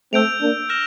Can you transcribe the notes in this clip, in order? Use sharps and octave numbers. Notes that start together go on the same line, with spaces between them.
A3 C4 E6 G6 D7 F7
A#3 D4
F6 A#6 E7 G7